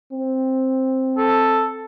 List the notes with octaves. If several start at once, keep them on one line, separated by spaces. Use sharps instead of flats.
C4
A4